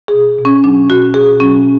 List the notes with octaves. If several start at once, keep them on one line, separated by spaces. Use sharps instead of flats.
G#4
B2
B2
C#4
F#3 D4
B2 F#4
B2 G#4
F#3 C#4